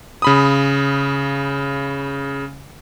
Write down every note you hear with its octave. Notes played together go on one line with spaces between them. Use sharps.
C#3 B5 D#6